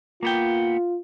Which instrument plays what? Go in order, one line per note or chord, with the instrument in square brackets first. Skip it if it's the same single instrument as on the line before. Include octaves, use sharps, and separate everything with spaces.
[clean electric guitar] A#3 B3 G5 [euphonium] F4